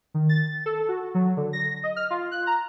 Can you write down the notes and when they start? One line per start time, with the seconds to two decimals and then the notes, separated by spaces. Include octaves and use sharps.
0.14 D#3
0.29 A6
0.66 A4
0.88 F#4
1.15 F#3
1.37 D3
1.53 A#6
1.83 D#5
1.96 F6
2.10 F4
2.31 F#6
2.47 A#5